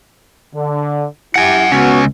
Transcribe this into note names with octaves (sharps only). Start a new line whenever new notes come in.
D3
E4 G4 F#5 G#5
C#2 B3 C#4 F#4